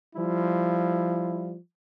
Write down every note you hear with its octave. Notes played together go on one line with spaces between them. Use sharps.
F3 G3 E4 F4